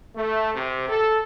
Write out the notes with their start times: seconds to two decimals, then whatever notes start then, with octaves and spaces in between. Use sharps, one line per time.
0.15 A3
0.55 C3
0.88 A4